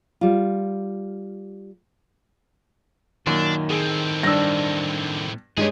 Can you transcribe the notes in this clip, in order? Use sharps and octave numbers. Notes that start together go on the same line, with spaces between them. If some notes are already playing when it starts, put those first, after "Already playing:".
G3 F4
F#2 A#2 D#3 D4
A2 C4 G#4
G2 D4 E6 A#6
G2 G#3 D#4 G4 G#4 C#5